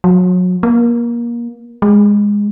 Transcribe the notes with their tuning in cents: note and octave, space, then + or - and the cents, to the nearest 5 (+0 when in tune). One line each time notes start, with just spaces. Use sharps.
F#3 -30
A#3 +25
G#3 -15